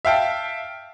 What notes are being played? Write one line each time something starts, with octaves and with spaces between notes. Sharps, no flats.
E5 F5 G5 A5